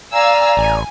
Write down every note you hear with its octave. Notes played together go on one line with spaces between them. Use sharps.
D5 F5 G#5 A#5 E6
A1 G#5